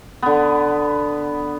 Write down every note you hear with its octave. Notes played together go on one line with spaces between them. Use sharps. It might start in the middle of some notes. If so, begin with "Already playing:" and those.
D3 B3